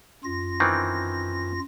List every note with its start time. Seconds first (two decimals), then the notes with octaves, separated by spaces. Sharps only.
0.24 F#2 F4 A#6
0.60 D#3 E3 C4